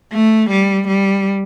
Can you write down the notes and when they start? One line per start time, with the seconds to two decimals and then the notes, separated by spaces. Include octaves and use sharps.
0.12 A3
0.50 G3
0.88 G3